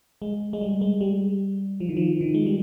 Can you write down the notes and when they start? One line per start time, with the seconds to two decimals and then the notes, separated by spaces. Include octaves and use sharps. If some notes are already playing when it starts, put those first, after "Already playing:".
0.22 G#3
0.53 G#3
0.61 G3
0.81 G#3
1.01 G3
1.80 F3
1.89 D#3
1.97 F3
2.21 D#3
2.34 G#3
2.46 G3